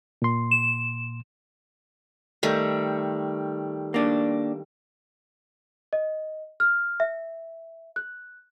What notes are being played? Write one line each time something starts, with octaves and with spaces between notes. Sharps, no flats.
A#2 C6
E7
D#3 G3 A3
A#3 D4
D#5
F6
E5
F#6